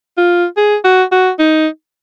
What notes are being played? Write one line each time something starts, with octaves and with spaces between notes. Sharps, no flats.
F4
G#4
F#4
F#4
D#4